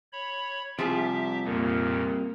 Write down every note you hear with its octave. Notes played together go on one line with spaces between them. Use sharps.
C#5 B5
C2 C3 F3 G4 G#4 E5
F2 A#2 C#3 A#3